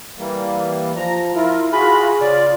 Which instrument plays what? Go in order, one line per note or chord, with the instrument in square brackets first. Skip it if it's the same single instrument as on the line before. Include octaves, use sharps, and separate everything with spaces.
[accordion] E3 G3 A#3
[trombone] F3 [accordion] A#5
[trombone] E4 [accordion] F4 A#4
[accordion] F4 F#4 [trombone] G#4 [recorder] B5
[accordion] C#3 F4 [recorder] D5